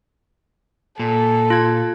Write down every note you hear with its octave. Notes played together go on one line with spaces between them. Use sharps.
A#2 A4
F4 G#6